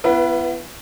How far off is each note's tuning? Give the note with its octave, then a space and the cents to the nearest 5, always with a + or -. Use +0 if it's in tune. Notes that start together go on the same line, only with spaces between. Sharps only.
B3 +10 E4 +40 B4 -15